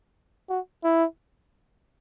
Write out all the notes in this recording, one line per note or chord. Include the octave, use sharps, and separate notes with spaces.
F#4
E4